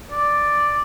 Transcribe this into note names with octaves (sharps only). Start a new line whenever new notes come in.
D5